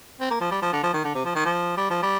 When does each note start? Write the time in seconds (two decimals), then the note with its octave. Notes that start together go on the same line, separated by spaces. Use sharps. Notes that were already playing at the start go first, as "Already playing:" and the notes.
0.21 C4
0.31 A#3
0.41 F3
0.51 G3
0.62 F3
0.73 D3
0.83 F3
0.94 D#3
1.04 D3
1.15 C3
1.25 F3
1.35 D#3
1.46 F3
1.77 G3
1.90 F3
2.02 G3